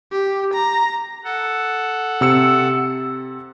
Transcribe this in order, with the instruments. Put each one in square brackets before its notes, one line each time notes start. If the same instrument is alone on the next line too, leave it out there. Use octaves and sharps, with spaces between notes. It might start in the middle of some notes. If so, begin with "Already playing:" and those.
[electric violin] G4
A#5
[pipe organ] A4 F#5
[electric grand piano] C3 E6 C#7